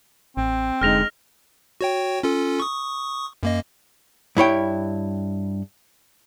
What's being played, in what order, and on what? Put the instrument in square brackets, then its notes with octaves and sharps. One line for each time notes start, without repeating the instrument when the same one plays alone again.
[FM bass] A1 [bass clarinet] C4
[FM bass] F1 [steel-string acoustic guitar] D3 G#3 D#4 [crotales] F6 A#6 F7
[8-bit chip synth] F#4 C#5 G5
C#4 F4 A4
C#6 D#6
F#2 A#3 D#5
[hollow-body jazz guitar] G2 E4 C#5 G5